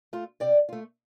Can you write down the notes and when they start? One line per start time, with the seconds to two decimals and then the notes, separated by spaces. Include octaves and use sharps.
0.13 A3 F4
0.40 C3 D5 G5
0.69 A3 F4